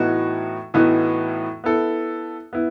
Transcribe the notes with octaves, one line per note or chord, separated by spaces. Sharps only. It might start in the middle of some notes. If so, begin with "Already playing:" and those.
Already playing: A2 E3 B3 D#4 F#4
A2 E3 B3 D#4 F#4
B3 E4 A4
B3 E4